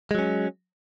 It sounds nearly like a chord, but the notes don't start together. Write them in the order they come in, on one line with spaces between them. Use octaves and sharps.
G#3 F#3 C#4